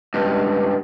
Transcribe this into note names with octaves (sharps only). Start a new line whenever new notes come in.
C#2 G2